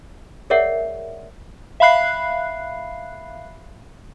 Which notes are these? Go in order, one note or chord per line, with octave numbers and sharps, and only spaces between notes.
G#4 A#4 C#5 D5 E5 F#5
E5 F5 B5 F#6 C7